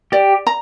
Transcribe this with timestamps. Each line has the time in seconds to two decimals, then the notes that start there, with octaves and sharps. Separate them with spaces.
0.12 G4 D5
0.47 A#5